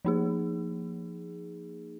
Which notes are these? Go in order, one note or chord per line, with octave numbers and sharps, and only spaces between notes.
F3 A#3 D#4 G#4